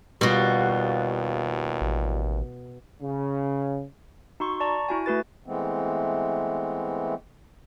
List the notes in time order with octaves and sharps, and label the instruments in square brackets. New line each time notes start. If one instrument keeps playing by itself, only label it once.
[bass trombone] D#2 [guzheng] B2 F#4 [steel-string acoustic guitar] G3 F4
[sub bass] A1
[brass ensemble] C#3
[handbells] D#4 F#4 C6 C#6
D5 A5 A#5 C#6
E4 F#4 G#5
A3 F#4 B4 A6
[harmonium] E3 G#3 A3 B3 C4